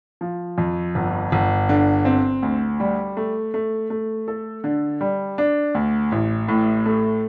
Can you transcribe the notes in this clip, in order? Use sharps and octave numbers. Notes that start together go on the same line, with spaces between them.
F3
F2
G1
G1
D3
C4
D2
G3
A3
A3
A3
A4
D3
G3
D4
D2
A1
A2
A3